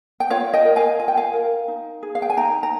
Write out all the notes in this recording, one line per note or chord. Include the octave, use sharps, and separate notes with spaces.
G5
F4 C#5 F5
D#5 G5
A#4
F5 G#5
F4 G#5
G5
F5 G#5
A#4
D#4
G#4
F5
G5
G#5
D#4 G5 A#5
A#5